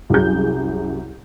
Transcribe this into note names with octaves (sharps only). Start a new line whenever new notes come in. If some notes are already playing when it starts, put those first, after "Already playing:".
C2 F#2 F#3 G#4 G6